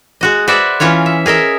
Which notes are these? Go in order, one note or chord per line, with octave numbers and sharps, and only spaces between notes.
G#3 F#4 D#5
F#4 B4 C5 D5 E5
E3 C#4 F4 C#5
E5
G#4 A#4 D#5 E5